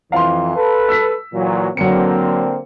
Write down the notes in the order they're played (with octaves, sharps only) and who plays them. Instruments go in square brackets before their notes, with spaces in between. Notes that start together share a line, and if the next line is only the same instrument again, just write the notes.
[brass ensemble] F2 E3 [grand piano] F5 C6
[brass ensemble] A4 B4
[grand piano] E6 B6
[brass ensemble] A#2 E3 F#3
[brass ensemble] D3 A#3 C4 [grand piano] F#3 C#7